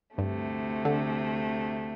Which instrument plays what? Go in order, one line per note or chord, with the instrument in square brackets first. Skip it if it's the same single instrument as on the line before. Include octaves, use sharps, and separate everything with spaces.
[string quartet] D2 C3 A3 [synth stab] G2
[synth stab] D3